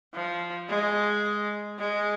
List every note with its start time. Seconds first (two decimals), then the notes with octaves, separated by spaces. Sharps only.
0.14 F3
0.69 G#3
1.78 G#3